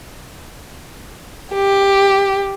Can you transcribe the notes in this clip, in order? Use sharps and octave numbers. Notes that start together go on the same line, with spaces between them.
G4